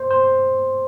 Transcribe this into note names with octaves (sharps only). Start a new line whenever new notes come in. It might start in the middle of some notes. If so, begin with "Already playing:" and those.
Already playing: C5
C5